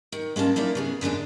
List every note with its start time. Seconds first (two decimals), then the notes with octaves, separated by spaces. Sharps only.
0.12 D#3
0.36 G#3 A#3 C#4 A5
0.56 A#3 D#4 E4 D5
0.75 C#3 B3 G#4
1.01 F#2 D3 G#3 D4